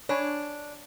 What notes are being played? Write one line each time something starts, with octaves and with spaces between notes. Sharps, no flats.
D4 C#5 G#5 B5